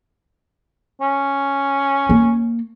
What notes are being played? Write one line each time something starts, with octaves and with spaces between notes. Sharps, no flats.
C#4
A#3